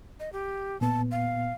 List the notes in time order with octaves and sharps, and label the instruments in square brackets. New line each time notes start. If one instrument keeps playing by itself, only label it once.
[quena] D#5
G4
[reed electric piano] A#2 B3 [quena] A5
[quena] F5